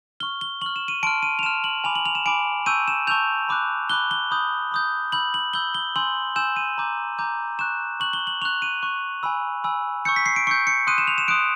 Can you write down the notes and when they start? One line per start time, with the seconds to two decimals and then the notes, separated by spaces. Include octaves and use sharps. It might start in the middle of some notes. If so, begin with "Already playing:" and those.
0.20 C#6 F6 G7
0.41 G7
0.62 C#6 F6 F#7
0.76 E7
0.88 D#7
1.03 A5 C6 F6 D7
1.23 D#7
1.39 F7
1.43 A5 C6 F6 E7
1.64 F#7
1.84 G#5 B5 D6 F7
1.95 F#7
2.05 F7
2.15 E7
2.26 G#5 B5 D6 D7
2.66 A5 C#6 E6 G6 D#7
2.88 E7
3.07 A5 C#6 E6 G6 F7
3.49 B5 D6 F#6
3.90 B5 D6 F#6 G7
4.11 G7
4.31 B5 D#6 G6
4.72 B5 D#6 G6
5.12 B5 E6 G6 F#7
5.34 F#7
5.54 B5 E6 G6 G7
5.75 G7
5.96 G#5 C6 E6 G6 F#7
6.36 G#5 C6 E6 G6 E7
6.56 D#7
6.78 A#5 D6 G6
7.19 A#5 D6 G6
7.59 C#6 F#6 E7
8.00 C#6 F#6 F#7
8.13 G7
8.27 F#7
8.42 C#6 F#6 F7
8.62 D#7
8.82 C#6 F#6
9.23 G#5 B5 E6
9.64 G#5 B5 E6
10.05 C#6 E6 G6 C#7
10.16 B6
10.26 C7
10.36 D7
10.47 C#6 E6 G6 C#7
10.67 C#7
10.87 C6 D#6 F#6 D#7
10.98 E7
11.08 F7
11.18 E7
11.28 C6 D#6 F#6 D7